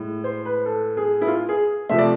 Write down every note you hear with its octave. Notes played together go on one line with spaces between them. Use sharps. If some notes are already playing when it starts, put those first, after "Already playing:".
Already playing: A2 G#3
C5
B4
A4
G#4
E4
F4
G#4
C3 F3 A3 E5
D5